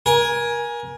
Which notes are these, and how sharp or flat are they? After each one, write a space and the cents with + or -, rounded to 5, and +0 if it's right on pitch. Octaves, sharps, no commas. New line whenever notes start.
A#4 +30 G#5 +0